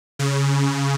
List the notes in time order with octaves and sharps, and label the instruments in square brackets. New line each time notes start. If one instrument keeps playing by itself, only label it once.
[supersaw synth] C#3